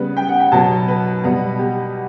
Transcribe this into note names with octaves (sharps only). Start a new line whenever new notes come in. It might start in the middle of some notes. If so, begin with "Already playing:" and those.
Already playing: C#3 G3 B3 B4
G5
F#5
G5
B2 F#3 B3 A5
B4
B2 G3 B3
G4